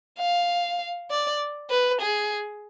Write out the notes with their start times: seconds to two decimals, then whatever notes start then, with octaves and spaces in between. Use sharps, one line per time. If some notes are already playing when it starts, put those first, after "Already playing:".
0.19 F5
1.11 D5
1.70 B4
2.02 G#4